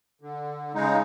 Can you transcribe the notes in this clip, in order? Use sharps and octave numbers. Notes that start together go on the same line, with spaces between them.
D3
C#3 G#3 D#4